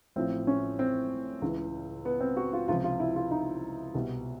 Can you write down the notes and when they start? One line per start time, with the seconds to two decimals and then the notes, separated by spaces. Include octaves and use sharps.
0.16 A1 A2 F3 C4
0.47 C#4
0.79 C4
1.42 C#2 C#3 E3
2.05 B3
2.20 C4
2.37 F#4
2.53 F4
2.68 C#2 C3 F3 F4
2.84 F4
3.00 E4
3.16 F4
3.31 D#4
3.95 C2 B2